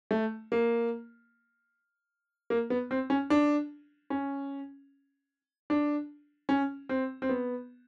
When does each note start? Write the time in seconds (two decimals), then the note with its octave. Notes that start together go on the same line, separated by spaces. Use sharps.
0.11 A3
0.52 A#3
2.50 A#3
2.70 B3
2.91 C4
3.10 C#4
3.30 D4
4.10 C#4
5.70 D4
6.49 C#4
6.89 C4
7.22 C4
7.29 B3